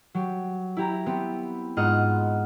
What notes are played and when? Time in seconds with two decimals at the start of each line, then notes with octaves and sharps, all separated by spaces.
0.14 F#3 G4
0.77 E4 G4 A#5
1.06 B3 C4 G4
1.77 G#2 F4 D#5 F#5 F6